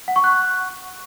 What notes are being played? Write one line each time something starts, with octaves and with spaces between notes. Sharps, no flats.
F#5
C#6
F#6